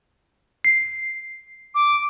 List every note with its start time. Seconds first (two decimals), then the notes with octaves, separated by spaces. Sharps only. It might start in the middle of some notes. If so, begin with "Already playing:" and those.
0.65 C7
1.75 D6